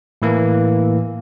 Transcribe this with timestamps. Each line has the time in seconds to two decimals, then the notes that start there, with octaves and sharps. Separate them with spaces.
0.22 A2 E3 A#3